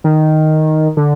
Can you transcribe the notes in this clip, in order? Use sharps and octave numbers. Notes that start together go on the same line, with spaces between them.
D#3
D3